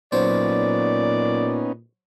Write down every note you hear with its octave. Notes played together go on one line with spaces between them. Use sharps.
A#2 F#3 B3 C#4 D#4 C5 D5